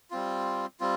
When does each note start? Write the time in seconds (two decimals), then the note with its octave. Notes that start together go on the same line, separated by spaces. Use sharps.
0.11 G3 C4 F4
0.80 G3 C4 F4